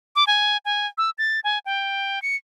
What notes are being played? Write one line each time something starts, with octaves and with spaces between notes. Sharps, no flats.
D6
G#5
G#5
E6
A6
G#5
G5
C#7